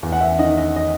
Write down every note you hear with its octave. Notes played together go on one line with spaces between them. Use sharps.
E2
F#5
E5
D#3 D#5
D#5
D#5